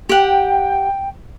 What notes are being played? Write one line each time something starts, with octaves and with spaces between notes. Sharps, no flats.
G4 F#5 G5